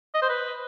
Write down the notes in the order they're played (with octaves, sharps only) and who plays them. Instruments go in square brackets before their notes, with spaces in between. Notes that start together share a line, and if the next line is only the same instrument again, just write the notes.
[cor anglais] D#5
C5
B4